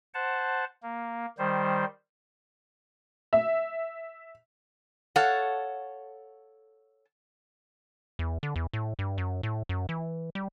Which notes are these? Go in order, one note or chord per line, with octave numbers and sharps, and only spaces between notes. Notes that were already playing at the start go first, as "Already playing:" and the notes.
C5 F#5 A5
A#3
D#3 G3 C5
E5
A4 C#5 F5 F#5
E2
D3
E2
A2
G2
F#2
A2
F#2
E3
G3